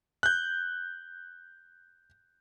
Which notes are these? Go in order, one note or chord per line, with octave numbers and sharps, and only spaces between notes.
F#6 G6